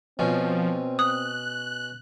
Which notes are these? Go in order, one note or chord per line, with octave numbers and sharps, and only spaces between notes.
B2 F3 C4 C#4
D#6 F#6